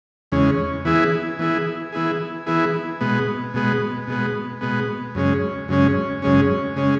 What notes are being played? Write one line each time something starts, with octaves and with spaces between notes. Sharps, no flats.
E2 C#3 G#3 C#4
E3 B3 E4 G#4
E3 B3 E4 G#4
E3 B3 E4 G#4
E3 B3 E4 G#4
B2 G#3 B3
B2 G#3 B3
B2 G#3 B3
B2 G#3 B3
F#2 C#3 G#3 C#4
F#2 C#3 G#3 C#4
F#2 C#3 G#3 C#4
C#3 G#3 C#4